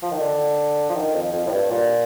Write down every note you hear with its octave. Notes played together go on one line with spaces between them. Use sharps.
F3
D#3
D3
F3
D#3
F2
F2
A2
G2
A#2